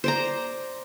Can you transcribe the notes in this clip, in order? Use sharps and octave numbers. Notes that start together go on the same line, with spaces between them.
C5 D5 A#5